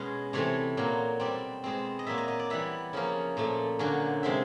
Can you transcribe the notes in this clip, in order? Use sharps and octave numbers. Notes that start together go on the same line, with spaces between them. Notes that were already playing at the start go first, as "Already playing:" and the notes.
Already playing: B2 G#3 C#4
C3 E3 A3 C4 C#5
A#2 F#3 A#3
B2 G3 C4 D5
B2 G#3 C4
D#5
A#2 F#3 A#3 E5
D#5
D#5
D5
E3 G3 B3 E5
C#3 F3 A#3 C#4
A#2 F3 A3
D3 F#3 A#3 C#4
C3 F3 G#3 C4 E5